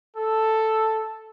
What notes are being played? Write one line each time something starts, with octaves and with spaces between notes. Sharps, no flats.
A4